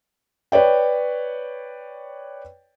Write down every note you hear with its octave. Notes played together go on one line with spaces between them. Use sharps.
B4 C#5 D5 G5